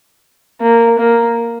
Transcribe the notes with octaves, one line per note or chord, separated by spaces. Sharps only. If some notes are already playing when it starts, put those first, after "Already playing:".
A#3
A#3